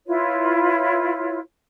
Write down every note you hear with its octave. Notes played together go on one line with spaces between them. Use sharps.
E4 F4 B4 C#5